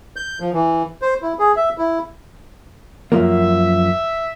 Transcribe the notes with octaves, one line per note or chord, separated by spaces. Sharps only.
G6
F3
E3
C5
E4
G#4
E5
E4
F#2 F3 A#3 E5